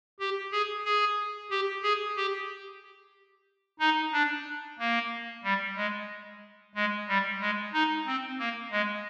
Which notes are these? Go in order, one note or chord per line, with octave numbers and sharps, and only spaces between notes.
G4
G#4
G#4
G4
G#4
G4
D#4
D4
A#3
G3
G#3
G#3
G3
G#3
D#4
C4
A#3
G#3